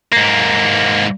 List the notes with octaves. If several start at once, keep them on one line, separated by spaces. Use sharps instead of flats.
G#2 A#3